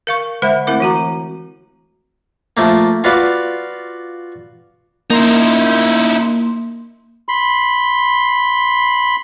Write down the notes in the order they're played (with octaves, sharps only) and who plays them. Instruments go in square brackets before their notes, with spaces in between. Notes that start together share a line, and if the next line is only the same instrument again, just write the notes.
[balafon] A#4 F5 C#6
D3 G#3 C5 E5 F#5 B5
A3 C4 E4 A#4 F#5 D6
E3 F#4 A#5
[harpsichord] F3 A3 A#3
F4 F#4 B4 D5 F5
[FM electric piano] A#3 C6 [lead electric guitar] D#4 E4
[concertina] B5 C6